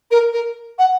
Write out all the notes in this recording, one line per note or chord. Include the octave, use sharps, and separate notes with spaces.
A#4
A#4
F#5